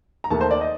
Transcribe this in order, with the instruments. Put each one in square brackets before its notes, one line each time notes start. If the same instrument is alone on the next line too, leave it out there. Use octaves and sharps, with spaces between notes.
[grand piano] A#5
D#2 D#3 A3 A5
C5
D5
D#5